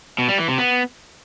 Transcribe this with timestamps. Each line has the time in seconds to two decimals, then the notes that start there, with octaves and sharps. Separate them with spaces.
0.18 B2
0.28 G3
0.38 E3
0.48 C3
0.58 B3